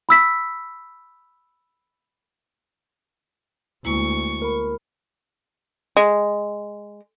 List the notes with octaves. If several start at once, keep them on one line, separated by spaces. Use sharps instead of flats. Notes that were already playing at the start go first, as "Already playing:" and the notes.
B5 E6 B6
D2 G#3 A#3 E4 C#6
A#4 B5
G#3